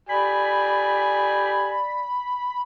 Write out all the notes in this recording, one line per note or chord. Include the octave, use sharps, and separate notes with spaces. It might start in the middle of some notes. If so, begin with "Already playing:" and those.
G4 D5 G#5 B5